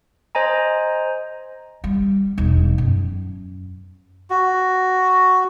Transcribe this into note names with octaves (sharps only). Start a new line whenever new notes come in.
C5 D#5 G#5 A#5
G3
E1 D#4
F#2
F#4